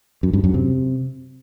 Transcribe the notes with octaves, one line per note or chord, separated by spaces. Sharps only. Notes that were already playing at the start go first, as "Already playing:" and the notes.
F#2
G2
F#2
C3